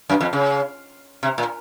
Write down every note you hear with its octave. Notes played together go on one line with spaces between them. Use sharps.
F#2
F2
C#3
C3
A#2